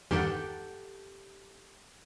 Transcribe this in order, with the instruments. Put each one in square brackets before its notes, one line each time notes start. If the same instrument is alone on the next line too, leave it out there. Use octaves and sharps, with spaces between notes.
[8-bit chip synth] E2 G2 D#3 [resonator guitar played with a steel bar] G4 A4 F#5